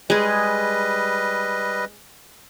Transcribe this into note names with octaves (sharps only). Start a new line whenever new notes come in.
G3 G#3 G#4 B4 D#5